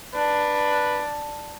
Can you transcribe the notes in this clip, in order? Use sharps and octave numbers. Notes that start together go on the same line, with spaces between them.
D4 B4